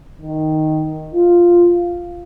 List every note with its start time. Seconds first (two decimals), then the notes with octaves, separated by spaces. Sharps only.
0.21 D#3
1.14 F4